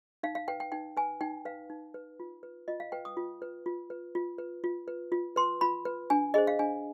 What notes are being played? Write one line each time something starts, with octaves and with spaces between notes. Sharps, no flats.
D#4 F5
F5
B4 G5
G5
D#4 G5
B4 G#5
D#4 G5
B4 F5
D#4
B4
F4
B4
F4 D#5
F5
B4 G5
D#6
F4
B4
F4
B4
F4
B4
F4
B4
F4
B4 C6
F4 B5
B4
D4 G#5
G#4 C5 D#5
F5
D4 G#5